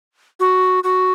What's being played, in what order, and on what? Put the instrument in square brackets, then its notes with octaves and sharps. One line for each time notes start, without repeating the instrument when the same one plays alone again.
[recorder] F#4
F#4